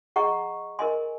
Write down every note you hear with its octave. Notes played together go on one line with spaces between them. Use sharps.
G#4 D#5 F#5 A#5 C#6
A#4 D#5 G#5 C6